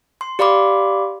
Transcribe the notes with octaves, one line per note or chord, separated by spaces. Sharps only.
C6
G4 D5 F5 B5 C6 D6